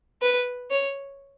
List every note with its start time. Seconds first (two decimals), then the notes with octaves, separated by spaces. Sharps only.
0.22 B4
0.70 C#5